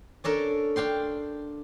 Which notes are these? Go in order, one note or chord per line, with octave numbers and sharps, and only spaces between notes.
C#4 D4 A4 A#4
D4 F5 G5 C6